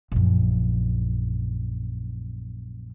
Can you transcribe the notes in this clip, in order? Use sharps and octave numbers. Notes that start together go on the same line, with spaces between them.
A#1 F#2